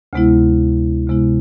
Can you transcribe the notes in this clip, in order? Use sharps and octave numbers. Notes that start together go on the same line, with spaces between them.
D2 C3 G#3 B3 E4
D2 C3 G#3 B3 E4